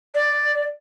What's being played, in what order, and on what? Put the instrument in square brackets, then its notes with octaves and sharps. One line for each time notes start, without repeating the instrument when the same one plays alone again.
[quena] D5